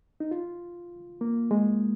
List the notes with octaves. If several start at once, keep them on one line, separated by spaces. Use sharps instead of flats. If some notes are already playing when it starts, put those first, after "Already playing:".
D#4
F4
A#3
G#3